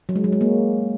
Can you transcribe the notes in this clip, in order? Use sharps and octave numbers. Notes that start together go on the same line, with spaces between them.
F#3
G#3
F#3
G#3
A#3